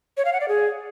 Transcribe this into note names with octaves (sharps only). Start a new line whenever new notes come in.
C#5
F5
F#5
D5
G#4